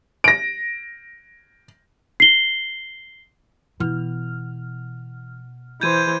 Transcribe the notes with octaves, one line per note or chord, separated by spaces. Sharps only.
A#6 D7
C7 G7
B2 E3 F6
E3 C5 G6 G#6 D#7